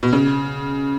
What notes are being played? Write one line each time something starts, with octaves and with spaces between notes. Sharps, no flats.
B2
C#3